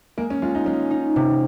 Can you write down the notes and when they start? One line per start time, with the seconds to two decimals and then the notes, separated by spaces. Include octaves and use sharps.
0.18 G#3 A#3
0.30 C#4
0.42 G#3 F4
0.55 D#4
0.66 G#3 C#4
0.91 D#4
1.16 C3